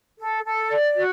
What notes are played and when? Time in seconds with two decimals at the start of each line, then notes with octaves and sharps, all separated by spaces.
0.19 A4
0.44 A4
0.70 D5
0.96 F#4